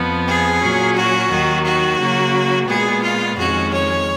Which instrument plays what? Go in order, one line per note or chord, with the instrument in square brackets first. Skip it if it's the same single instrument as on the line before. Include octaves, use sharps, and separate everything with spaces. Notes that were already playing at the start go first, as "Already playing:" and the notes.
Already playing: [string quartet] F2 F3 B3
G#4
A#2 F#3 C#4
F#4
D#2 D#3 F#3
F#4
C#3 F#3 A#3
A#2 G#3 B3 G#4
F4
F2 D#3 G#3 C#4 F#4
C#5